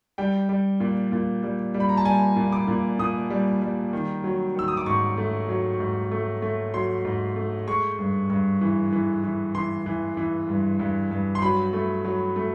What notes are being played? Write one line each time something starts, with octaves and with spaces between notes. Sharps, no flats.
G3 G5
G3
A#2
A#2
G3
G3
B5
A#5
A5
G3 G#5
A#2
D6
A#2
A#2 D#6
G3
G3
D#3
F#3
D#3 E6
D#6
D6
G#2 C#6
A3
F#3
G#2
A3
A3
F#3 C6
G#2
A3
G#3 C#6
G2
G2
E3
E3
E3
E3 C6
E3
E3
G2
G2
G2
C6
F#3 B5
A3
F#3
A3